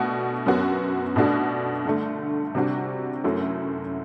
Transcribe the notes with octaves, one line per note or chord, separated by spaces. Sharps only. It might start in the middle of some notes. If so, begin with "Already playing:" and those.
Already playing: B2 A3 D4 F#4
F#2 F#3 B3 F#4
B2 A3 D4 F#4
G2 D3 A3
C3 G3 D4 F#4
F#2 F#3 A3 E4